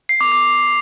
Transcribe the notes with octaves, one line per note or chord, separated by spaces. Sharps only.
C7
D6
D6